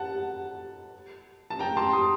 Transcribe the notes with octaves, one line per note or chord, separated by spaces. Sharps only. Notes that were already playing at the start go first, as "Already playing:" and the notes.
Already playing: F#5 A5
A5
G5 A#5
A5 C6
C6 D#6